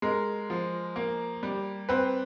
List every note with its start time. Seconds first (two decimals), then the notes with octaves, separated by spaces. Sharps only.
0.02 G#3 A#4
0.50 F3
0.96 A#3
1.43 G3
1.89 C4 B4